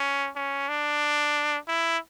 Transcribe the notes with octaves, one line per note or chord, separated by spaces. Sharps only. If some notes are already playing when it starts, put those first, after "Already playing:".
Already playing: C#4
C#4
D4
E4